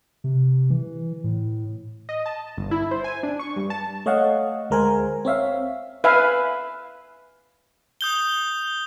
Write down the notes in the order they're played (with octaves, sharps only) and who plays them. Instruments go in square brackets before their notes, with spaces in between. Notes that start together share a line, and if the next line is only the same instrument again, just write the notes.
[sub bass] C3
E3
A2
[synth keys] D#5
A5
G1
E4
C5
G#5
D4
C#6
G2
A5
[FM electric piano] A3 C#5 D#5 F5 F#5
D2 G#3 A#4 C5 G#5
C4 C#5 E5 F5
[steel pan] B4 E5 F5 G#5
[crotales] D#6 G6 G7